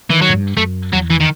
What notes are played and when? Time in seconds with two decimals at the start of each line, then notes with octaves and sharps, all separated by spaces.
0.10 D#3 E3
0.22 F#3
0.29 A2
0.34 G2
0.57 F#2 A3
0.93 E2 F#3
1.10 E3
1.20 D#3